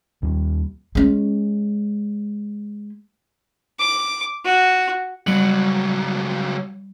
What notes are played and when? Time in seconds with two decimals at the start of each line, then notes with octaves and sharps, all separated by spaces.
0.22 D#2 G3
0.95 G#3 C#4
3.79 D6
4.45 F#4
5.27 C#2 F#3 G3 F#7